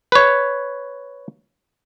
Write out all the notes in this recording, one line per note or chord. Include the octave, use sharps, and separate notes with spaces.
B4 C#5